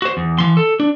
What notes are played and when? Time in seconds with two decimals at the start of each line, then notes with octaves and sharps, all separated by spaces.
0.02 F#4 C5
0.17 E2
0.39 E3 C6
0.57 A4
0.80 D4